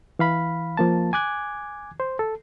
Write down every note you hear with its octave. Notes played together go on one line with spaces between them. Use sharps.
E3 F5 B5
F3 A#3 A5
G#5 D6 F#6 G#6
C5
A4